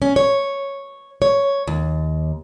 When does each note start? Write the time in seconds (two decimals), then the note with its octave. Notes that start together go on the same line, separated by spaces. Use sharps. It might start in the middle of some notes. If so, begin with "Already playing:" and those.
0.02 C#4
0.16 C#5
1.22 C#5
1.67 D#2